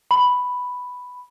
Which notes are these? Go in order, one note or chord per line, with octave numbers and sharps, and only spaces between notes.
B5